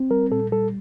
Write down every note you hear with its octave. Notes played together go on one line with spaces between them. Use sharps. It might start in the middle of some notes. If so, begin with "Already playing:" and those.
Already playing: C4
G3 A#4
A#2 A4
G3 A4